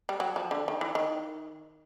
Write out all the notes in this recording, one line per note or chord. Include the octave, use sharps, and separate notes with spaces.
G3
F#3
F3
D3
D#3
E3
D#3